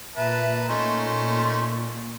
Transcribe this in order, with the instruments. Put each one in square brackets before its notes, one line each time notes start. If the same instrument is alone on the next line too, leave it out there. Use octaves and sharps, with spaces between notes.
[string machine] A#2 [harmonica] B4 A5 A#5 [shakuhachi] E5
[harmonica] A3 C#4 D#4 [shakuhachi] C6